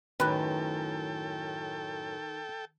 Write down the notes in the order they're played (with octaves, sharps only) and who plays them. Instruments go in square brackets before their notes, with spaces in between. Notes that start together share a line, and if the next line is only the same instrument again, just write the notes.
[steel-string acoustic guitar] F#2 A2 [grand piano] D#3 [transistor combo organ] A4 G5 [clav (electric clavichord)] B4